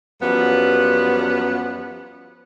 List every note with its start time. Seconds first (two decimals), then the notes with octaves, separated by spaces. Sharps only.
0.21 F#2 F3 G3 B3